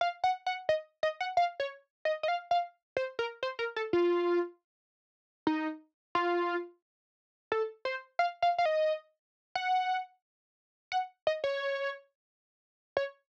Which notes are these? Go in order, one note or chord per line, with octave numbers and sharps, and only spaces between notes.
F5
F#5
F#5
D#5
D#5
F#5
F5
C#5
D#5
D#5
F5
F5
C5
A#4
C5
A#4
A4
F4
D#4
F4
A4
C5
F5
F5
F5
D#5
F#5
F#5
D#5
C#5
C#5